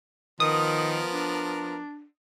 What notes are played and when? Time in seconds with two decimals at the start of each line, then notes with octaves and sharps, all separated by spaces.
0.40 D#3 F3 B3 A#4 D#6
1.13 D4